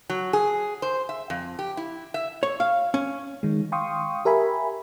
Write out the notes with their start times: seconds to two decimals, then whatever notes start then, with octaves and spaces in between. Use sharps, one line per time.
0.10 F#3
0.33 G#4
0.82 C5
1.09 E5
1.30 F2
1.59 G4
1.77 E4
2.14 E5
2.43 C#5
2.60 F5
2.94 C#4
3.43 D#3 G#3
3.72 F5 G5 C6 C#6 D#6
4.25 G4 A#4 E5 G#5 B5